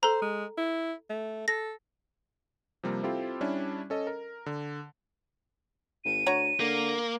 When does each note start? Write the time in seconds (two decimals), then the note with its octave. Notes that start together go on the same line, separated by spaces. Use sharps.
0.03 A4 C5 A#5
0.22 G#3
0.57 E4
1.10 A3
1.48 A4 A#6
2.83 C3 F3 G3 A#3
3.03 C4 E4 F4 G4 A4 C5
3.41 G3 C#4 D4 E4
3.90 C#4 A4 D#5
4.07 A#4
4.46 D3
6.05 G#1 D#7
6.26 D2 C#5 F#5 A#5
6.60 D3 A#3